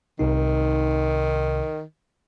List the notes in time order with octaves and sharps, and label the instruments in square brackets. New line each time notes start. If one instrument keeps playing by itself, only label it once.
[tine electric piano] C2 C3 D#4 [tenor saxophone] D#3